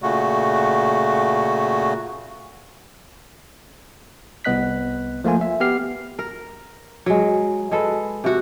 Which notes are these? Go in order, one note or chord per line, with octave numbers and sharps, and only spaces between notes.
A#2 C#3 A3 F#4
C2 B3 D#5 F#6 B6
F3 A3 A#3 F4 G#5
E5
B3 G4 F6 C7
A#4
F#3 G#3
G#3 A4 B4
C3 F#4